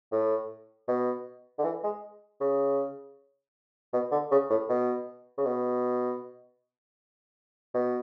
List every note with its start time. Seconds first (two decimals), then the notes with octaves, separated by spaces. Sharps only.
0.12 A2
0.88 B2
1.59 D3
1.64 E3
1.84 G#3
2.41 C#3
3.93 B2
4.12 D3
4.31 C#3
4.50 A2
4.69 B2
5.38 C#3
5.45 B2
7.74 B2